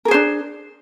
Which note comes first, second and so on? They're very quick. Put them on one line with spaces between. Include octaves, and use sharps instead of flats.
A#4 G#4 C5 D4